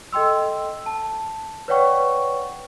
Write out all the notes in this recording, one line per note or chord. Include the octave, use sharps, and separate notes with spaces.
A4 D#5 G5 C6 E6
A5
B4 C#5 D5 F#5 G5 C#6